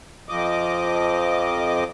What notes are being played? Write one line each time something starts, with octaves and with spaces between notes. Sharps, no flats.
F2 F3 D#5 D6